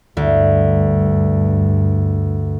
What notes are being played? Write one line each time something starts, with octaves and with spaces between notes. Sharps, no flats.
D2 G2